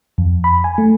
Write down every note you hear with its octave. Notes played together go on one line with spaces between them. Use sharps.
F2
B5
G#5
A3